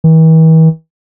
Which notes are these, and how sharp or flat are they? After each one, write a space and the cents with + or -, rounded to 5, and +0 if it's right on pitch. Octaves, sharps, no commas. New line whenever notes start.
E3 -45